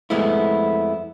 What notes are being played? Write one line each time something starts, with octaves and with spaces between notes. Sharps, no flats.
F2 G#3 A3 B3 E4